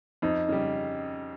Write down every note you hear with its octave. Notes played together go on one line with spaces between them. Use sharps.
F2 D#4
C#3 G3